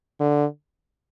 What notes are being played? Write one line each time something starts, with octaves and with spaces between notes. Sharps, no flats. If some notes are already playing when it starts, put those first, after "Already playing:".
D3